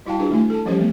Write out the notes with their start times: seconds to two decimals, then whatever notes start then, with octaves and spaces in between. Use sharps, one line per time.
0.06 G3 E4 F#4 F5 G5 A5
0.19 D4 F4 F#4 G#4 B4 C5
0.30 D#3 A3 E4 G#5
0.50 A4 A5
0.65 E3 F3 G3 C#4 G4 C5
0.79 A3 B3